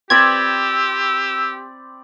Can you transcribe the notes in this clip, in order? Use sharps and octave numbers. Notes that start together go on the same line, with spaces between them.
C4 G4 D5 B5 E6 G#6